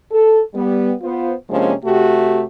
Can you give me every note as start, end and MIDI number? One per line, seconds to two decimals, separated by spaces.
0.11 0.41 69
0.55 0.92 55
0.55 0.92 59
1.02 1.32 59
1.02 1.32 65
1.02 1.32 72
1.50 1.73 48
1.50 1.73 53
1.50 1.73 56
1.50 1.73 58
1.50 1.73 61
1.50 1.73 62
1.85 2.44 48
1.85 2.44 57
1.85 2.44 66
1.85 2.44 67